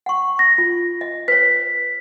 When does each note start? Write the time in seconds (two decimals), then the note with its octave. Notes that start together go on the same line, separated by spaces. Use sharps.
0.06 F#5 C#6
0.39 A#6
0.58 F4
1.01 D#5
1.28 B4 C#5 B6